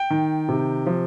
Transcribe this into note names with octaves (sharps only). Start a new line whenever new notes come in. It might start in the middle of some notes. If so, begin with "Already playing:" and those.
Already playing: G5
D#3
C3
F3